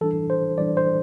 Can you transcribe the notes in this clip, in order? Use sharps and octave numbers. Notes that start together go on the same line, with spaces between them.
E3 G3 D4 A4
C5
E3 G3 D4 D5
C5